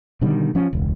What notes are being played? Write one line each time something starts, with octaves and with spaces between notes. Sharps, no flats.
B2 D3 D#3 G3
F3 C#4
E1 C#2